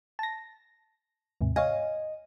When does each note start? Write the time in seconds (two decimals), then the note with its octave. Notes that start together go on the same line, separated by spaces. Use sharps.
0.19 A5 A#6
1.41 D#2 G#2 C3
1.56 C#5 D#5 F5 G#5